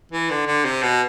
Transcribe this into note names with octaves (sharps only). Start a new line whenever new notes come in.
E3
D3
D3
C3
B2